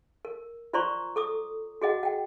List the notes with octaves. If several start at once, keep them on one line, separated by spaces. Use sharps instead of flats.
A#4
F4 C5 D5 A#5 C6 C#6
A4 D6 D#6
F#4 G#4 D#5 F#5
F#5 G5